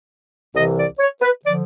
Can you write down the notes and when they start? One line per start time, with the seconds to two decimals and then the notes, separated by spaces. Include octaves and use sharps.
0.54 C2 C3 E3 D#5
0.77 D5
0.99 C#5
1.22 B4
1.45 D3 F3 D5